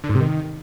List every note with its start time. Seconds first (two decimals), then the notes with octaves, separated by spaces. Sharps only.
0.04 D3
0.09 G#2
0.15 C3
0.20 D#3